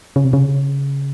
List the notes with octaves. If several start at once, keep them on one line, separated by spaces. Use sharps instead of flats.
C#3
C3
C#3